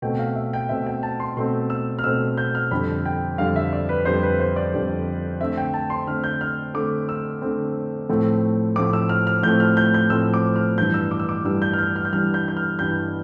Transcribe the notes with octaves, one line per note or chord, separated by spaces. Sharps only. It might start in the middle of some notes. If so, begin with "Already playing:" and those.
B2 A3 C4 G5
F5
E5
G5
B2 A3 C4 E5
G5
A5
C6
B2 A3 C4 C6
E6
F6
B2 A3 C4 E6
G6
F6
F2 D3 G3 B5
G5
F2 D3 G3 F5
E5
D5
B4
F2 D3 G3 C5
B4
C5
D5
F2 D3 G3
D3 A3 C4 E5
G5
A5
C6
D3 A3 C4 F6
G6
F6
D3 A3 C4 D6
E6
D3 A3 C4
A2 F3 A3 C4
A2 F3 A3 C4 D6
E6
F6
F6
A2 F3 A3 C4 G6
F6
G6
G6
A2 F3 A3 C4 E6
D6
F6
G2 E3 G3 D4 G6
E6
D6
E6
D6
G2 E3 G3 D4 E6
G6
F6
G6
F6
G6
G2 E3 G3 D4 F6
G6
G6
F6
G2 E3 G3 D4 G6